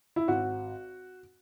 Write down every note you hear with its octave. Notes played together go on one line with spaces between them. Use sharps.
E4
G#1 F#4